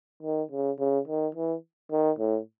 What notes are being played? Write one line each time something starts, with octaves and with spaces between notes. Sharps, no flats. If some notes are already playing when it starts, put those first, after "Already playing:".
D#3
C#3
C#3
D#3
E3
D#3
A2